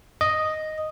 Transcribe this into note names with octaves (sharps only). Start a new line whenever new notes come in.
D#5